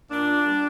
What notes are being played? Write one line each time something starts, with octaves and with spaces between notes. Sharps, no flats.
A#2 D4
G3